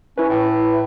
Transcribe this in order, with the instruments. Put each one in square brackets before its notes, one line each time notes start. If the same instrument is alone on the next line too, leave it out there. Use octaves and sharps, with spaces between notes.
[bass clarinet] C#4 [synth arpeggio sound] E4 B4
[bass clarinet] A2